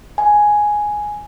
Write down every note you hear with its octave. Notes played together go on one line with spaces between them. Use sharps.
G#5